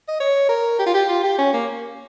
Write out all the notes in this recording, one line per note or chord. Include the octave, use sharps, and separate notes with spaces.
D#5
C#5
A#4
G4
F4
G4
F4
G4
C#4
A#3